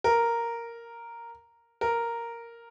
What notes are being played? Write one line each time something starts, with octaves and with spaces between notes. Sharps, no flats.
A#4
A#4